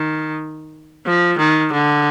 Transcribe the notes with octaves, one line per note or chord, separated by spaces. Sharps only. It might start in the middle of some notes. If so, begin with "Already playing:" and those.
Already playing: D#3
F3
D#3
D3